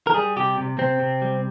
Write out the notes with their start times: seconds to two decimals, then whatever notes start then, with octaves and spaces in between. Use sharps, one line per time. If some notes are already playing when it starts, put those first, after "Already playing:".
0.07 A#4
0.14 G3 G#4
0.37 C3 G4
0.58 C3
0.78 C3 C4
0.99 C3
1.22 G3